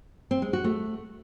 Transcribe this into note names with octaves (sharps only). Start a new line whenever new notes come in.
C4
G#3
F#4
A3